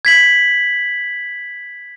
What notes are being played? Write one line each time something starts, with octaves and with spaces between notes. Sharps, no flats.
G#6 B6 F#7